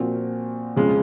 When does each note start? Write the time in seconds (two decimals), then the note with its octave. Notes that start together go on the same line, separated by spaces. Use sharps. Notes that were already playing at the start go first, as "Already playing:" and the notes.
Already playing: A#2 F3 C4 F#4
0.76 F2 C#3 G#3 C#4